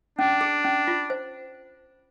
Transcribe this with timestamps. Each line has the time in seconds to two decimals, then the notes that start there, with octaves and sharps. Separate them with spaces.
0.19 C#4 D4
0.41 G#4
0.65 C#4
0.87 F4
1.10 C5